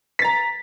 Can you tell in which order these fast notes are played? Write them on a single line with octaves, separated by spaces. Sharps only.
B6 A6 A#5